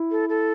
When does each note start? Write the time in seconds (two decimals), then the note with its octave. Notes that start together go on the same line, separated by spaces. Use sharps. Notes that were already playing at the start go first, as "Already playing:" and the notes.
Already playing: E4
0.11 A4
0.29 A4